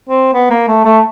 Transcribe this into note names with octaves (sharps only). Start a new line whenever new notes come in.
C4
B3
A#3
A3
A3